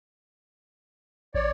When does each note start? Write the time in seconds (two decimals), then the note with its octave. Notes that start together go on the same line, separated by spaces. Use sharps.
1.35 A1 C#5 D5